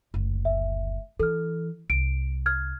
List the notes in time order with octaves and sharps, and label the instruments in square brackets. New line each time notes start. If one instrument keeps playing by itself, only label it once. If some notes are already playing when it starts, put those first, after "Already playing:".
[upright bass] F#1 D2
[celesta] E5
[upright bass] E3 [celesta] A4 F6
[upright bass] C2 [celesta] D7
[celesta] F6 G#6